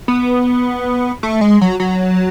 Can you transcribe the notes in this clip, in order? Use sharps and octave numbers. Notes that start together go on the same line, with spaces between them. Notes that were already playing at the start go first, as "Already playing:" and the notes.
B3
A3
G#3
F#3
F#3